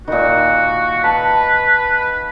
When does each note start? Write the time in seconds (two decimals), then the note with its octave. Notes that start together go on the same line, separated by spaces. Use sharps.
0.08 A#2 D#3 F#4
1.04 B4 A5